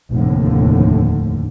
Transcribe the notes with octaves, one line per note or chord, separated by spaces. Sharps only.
F1 D#2 A2 D3